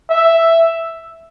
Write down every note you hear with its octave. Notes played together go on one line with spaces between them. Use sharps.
E5